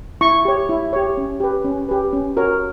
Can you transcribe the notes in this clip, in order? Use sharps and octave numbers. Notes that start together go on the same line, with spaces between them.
E4 C#6
G4 C#5
E4
G4 C#5
C#4
G4 B4
C#4
G4 B4
C#4
F#4 A#4 C#5